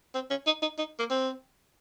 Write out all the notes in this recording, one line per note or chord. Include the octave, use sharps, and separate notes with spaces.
C4
C#4
D#4
D#4
D#4
A#3
C4